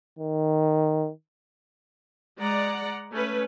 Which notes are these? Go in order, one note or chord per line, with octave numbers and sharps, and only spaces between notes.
D#3
G#3 D5 F#5 A#5
A3 C#4 B4